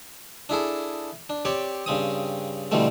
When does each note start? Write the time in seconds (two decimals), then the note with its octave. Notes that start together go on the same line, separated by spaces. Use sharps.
0.49 D4 E4 G#4 A4
1.30 D4
1.45 C4 G4 C#5 D5
1.86 G2 C#3 C4 D#6
2.71 B2 D3 E3 G3 A3 C4